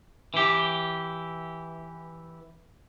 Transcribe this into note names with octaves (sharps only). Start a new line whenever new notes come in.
E3 G4